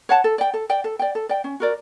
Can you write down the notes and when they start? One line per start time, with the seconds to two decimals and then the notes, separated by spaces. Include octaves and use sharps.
0.09 C#5 F#5 A5
0.24 A4
0.38 D5 G5
0.54 A4
0.69 D5 G5
0.84 A4
0.99 D5 G5
1.15 A4
1.29 D5 G5
1.44 C#4
1.60 F#4 A#4 D5